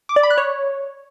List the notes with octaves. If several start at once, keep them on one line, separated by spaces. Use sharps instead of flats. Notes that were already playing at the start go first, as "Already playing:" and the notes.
D6
D5
B5
F#6
C#5